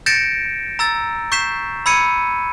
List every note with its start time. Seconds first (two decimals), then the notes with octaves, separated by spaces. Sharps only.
0.06 G6 A6 A#6 C#7 D7 E7
0.79 A#5 E6 A6
1.32 C#6 G6 B6 C7 E7
1.86 B5 E6 G#6 C#7 D#7